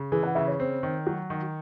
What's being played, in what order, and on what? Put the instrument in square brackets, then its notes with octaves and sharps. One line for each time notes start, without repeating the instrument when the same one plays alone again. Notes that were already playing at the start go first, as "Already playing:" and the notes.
Already playing: [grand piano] C#3
[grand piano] E3 [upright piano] G#4
[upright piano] F#5
[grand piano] C#3 [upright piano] E5
[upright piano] C#5
[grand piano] C4
D#3
F#3
D#3